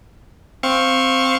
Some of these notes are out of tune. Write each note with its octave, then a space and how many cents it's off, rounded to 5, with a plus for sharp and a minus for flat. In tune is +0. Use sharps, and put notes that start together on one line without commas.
C4 +0 F5 +0 C#6 -15